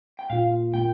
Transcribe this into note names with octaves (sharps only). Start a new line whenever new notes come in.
G5
A#2 A#3 F4 F5
A#2 A#3 F4 G5